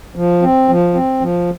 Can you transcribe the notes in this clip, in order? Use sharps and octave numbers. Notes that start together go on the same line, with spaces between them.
F3
C4
F3
C4
F3